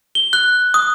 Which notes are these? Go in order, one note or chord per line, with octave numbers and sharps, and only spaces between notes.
G7
F#6
D#6